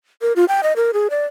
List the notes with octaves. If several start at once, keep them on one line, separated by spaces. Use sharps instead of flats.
A#4
F4
G5
D#5
A#4
G#4
D5